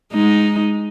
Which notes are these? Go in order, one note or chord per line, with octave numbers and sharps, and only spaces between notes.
G#3 D#4